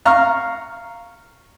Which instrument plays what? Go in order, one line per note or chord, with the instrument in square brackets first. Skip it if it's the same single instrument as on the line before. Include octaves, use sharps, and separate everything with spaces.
[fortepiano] F5 A#5 C#6 F6